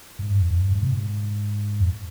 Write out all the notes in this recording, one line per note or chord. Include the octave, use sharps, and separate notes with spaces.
G#2
G2
F2
F2
G2
G#2
C3
G#2
F2